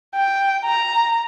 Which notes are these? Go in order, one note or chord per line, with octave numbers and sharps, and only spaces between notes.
G5
A#5